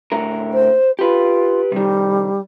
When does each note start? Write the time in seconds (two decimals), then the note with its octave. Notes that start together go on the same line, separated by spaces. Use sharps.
0.12 A2 D3 A#4
0.53 C5
0.99 F4 G4 B4
1.72 C3 D#3 G3